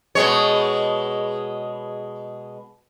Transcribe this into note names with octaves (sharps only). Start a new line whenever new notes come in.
B2 G#3 C#5